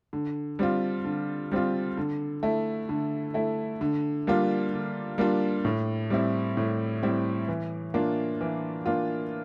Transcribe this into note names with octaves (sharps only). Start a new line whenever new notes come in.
D3
G3 C4 F4
D3
G3 C4 F4
D3
A3 E4
D3
A3 E4
D3
G3 A#3 D4 F4
D3
G3 A#3 D4 F4
A2
G3 C4 E4
A2
G3 C4 E4
E3
A#3 D4 F4
E3
A#3 D4 F4